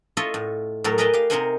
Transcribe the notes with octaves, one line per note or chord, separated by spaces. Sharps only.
E4 F4 A4 C#5 D#5
A2
A2 F#3 A4 A#4
G#4 A#4 B4 D#5 G5 A5
G4 F5
C3 D#4 A#4 C5 F#5 G#5